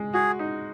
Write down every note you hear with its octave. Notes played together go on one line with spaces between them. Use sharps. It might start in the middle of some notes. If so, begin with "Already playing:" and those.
Already playing: G#3
F#4 G#4
D#4